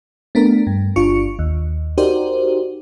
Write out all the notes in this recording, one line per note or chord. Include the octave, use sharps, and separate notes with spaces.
A3 B3 D4 A#4
G2
G1 D4 F4 C#6 C#7
D#2
D#4 F#4 G4 A#4 C5 D5